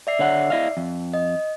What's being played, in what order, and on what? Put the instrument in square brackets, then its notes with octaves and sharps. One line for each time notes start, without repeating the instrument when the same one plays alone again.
[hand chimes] D5 E5 C7
[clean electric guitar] D3 C#5 F#5
E4 D#5 F5
F2
[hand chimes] D#5